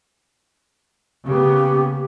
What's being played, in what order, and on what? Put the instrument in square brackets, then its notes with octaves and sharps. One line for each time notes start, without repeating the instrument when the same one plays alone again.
[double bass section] C#3 A#3 B3 [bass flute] G4